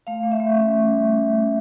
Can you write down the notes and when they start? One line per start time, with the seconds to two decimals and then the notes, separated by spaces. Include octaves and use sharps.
0.07 A3 F5
0.23 A3
0.32 E5
0.40 A3
0.56 C#4
0.71 C#4
0.88 G3